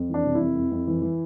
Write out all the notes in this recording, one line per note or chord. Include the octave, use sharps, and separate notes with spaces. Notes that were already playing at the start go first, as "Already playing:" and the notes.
Already playing: F2
E3 D4
C3
E4
F2
F2
F2
E3
E3